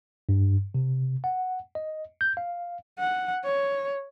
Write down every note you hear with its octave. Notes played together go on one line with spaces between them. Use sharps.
G2
C3
F#5
D#5
G6
F5
F#5
C#5